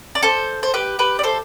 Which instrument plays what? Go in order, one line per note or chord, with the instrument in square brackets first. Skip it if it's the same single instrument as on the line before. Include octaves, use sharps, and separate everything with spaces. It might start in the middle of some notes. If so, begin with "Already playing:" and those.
[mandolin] D5
A4 C5
C5
G4 B4
G4 B4
D5
A4 C5